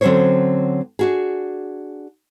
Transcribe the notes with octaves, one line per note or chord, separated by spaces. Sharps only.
D3 F#3 C4 C#4 C5 C#5
D4 F#4 G#4